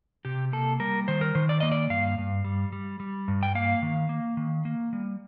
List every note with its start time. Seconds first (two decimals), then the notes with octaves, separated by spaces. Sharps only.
0.25 C3 G4
0.52 A#3 A4
0.80 G3 A#4
1.08 D#3 C5
1.21 A#4
1.35 D#3 C5
1.49 D5
1.60 A#3 D#5
1.72 D5
1.90 G2 F5
2.18 G2
2.44 G3
2.73 G3
3.00 G3
3.28 G2
3.43 G5
3.55 A#3 F5
3.82 D#3
4.09 A#3
4.37 D#3
4.65 A#3
4.93 G3